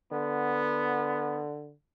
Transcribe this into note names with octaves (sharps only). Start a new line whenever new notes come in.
D3 B3